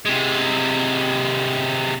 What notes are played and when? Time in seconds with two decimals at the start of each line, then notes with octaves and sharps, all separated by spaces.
0.05 C3 G#3